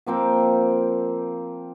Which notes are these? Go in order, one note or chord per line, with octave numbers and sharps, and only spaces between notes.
F3 A#3 C4 G5